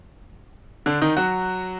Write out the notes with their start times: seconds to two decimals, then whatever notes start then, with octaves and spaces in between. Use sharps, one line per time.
0.86 D3 D4
1.01 D#3 D#4
1.17 F#3 F#4